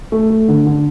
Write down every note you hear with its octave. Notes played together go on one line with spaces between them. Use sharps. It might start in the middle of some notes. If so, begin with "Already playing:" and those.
A3
A3
D3
D3